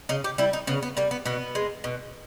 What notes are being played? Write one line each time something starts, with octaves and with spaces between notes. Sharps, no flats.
C#3 D#4
G4
G3 E4
D#4
C#3 B3
B3
G3 A#3
B3
B2 B3
G#3
B2